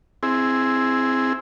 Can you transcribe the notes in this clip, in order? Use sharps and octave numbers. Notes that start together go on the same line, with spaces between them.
C4 E4 G#4